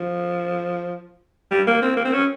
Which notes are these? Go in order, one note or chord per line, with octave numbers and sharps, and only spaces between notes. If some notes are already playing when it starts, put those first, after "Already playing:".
Already playing: F3
G3
A#3
C4
A#3
C4
C#4